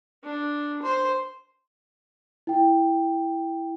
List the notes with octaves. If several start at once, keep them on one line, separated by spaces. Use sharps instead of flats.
D4
C5
E4 G5